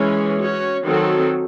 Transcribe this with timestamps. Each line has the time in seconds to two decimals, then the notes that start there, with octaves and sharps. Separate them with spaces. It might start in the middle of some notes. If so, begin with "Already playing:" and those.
Already playing: E3 G#3 C#4 G#4 C#5
0.38 C#4 F#4 C#5
0.84 D#3 F#3 C4 F#4 A4